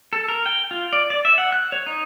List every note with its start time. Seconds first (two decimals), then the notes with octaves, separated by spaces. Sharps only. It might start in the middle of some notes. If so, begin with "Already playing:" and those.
0.13 A4
0.28 A#4
0.46 G5
0.71 F4
0.93 D5
1.10 D5
1.25 E5
1.38 F#5
1.52 F#6
1.72 C#5
1.86 D#4